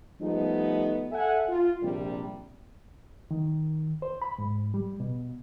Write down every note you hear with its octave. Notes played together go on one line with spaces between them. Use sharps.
F3 G3 A3 B3 D#4
A4 E5 F#5 G#5
F4
A#1 C3 G3
D#3
C5
B5
G#2
G3
B2